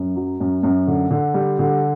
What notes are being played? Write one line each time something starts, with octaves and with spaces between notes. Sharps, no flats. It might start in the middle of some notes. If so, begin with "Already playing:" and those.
Already playing: F#2
F#3
F#2
F#2
D3
D3
G3
D3